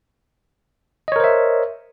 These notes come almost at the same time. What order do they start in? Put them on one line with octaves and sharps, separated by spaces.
D#5 C#5 A#4 C5 E5